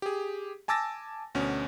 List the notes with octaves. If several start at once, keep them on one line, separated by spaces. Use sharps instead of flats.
G4 G#4
G#5 A5 D6 E6 A6 A#6
D2 B2 C#4